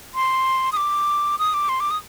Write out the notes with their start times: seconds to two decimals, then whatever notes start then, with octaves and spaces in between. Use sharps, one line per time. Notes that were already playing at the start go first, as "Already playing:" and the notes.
0.15 C6
0.72 D#6
0.77 D6
1.39 D#6
1.54 D6
1.69 C6
1.80 D6
1.91 D#6